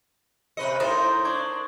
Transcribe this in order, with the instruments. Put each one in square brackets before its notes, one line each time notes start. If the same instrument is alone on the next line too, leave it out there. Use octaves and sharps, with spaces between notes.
[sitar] C3 B4 D#5 [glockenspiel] C#7 G7
[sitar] A2 D#4 [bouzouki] A#4 C5 [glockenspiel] D#6 A6 G7
[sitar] D4 [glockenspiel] C#6 D6 G#6